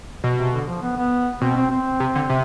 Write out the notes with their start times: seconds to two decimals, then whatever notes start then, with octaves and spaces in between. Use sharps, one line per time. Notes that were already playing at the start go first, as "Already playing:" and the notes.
0.24 B2
0.38 C3
0.53 D3
0.68 F3
0.82 B3
0.97 B3
1.41 B2 C4
1.56 C4
1.71 C4
2.00 C3
2.15 D3
2.30 C3